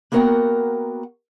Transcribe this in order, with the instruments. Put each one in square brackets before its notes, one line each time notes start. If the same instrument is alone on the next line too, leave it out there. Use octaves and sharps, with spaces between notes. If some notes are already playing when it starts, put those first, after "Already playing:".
[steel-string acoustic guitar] A#3 B3 F#4 A#4 F#5 G5